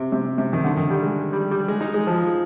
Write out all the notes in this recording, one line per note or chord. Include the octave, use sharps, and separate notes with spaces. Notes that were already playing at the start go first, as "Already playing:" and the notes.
Already playing: C3
C3
C3
D#3
D3
D#3
G3
G#3
G3
G3
G#3
D#4
G#3
F3